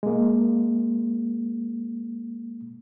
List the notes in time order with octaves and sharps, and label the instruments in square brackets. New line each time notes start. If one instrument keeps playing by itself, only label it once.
[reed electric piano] G#3 A#3